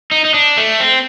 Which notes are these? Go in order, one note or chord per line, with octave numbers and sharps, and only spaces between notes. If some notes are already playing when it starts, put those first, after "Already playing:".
D#4
D#4
D4
A3
C4